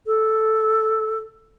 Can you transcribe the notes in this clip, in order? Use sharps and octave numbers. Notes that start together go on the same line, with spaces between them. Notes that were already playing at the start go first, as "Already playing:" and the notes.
A4